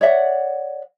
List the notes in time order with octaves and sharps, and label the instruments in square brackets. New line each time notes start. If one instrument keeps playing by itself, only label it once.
[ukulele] C#5 D5 E5 F#5